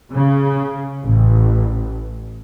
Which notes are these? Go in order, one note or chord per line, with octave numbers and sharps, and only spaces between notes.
C#3
A1